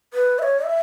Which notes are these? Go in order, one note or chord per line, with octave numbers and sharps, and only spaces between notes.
B4
E5
C#5
E5